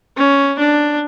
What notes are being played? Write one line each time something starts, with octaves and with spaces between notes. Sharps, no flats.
C#4
D4